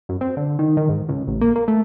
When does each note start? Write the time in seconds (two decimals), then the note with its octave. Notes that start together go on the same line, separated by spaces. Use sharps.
0.09 F#2
0.21 C4
0.37 D3
0.59 D#3
0.77 D#3
0.89 G#2
1.09 C#2
1.27 A1
1.41 A#3
1.56 A#3
1.68 A3